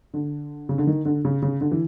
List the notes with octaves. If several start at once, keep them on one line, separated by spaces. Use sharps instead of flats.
D3
C#3
D3
D#3
D3
C#3
C#3
D3
E3